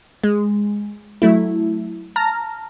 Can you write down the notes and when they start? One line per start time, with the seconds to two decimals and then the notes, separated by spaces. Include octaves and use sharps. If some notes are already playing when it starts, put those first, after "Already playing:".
0.23 G#3
1.22 F#3 A3 E4
2.16 A5 A#5 F6 A#6